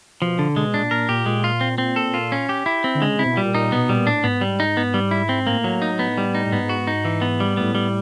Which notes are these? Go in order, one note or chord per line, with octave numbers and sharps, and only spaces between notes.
B2 F3
D3
B2 G#3
A#2 D4
A#2 A#4
A#2 G4
A#2 G#3
F4
C4
C4
A4
F4
C#4
G4
E4
C4
D3
C#3 G#3
C3 E4
B2
A#2 G3
A#2 D#4
B2 B3
A#2 G3
A2 D4
G#2 B3
G3
D#4
B3
G3
E4
C4
A2 A#3
F#3
D#4
B3
G3
D#4
A2
G#2 B3
F#4
D#4
E3
B3
G3
A2 B3
G3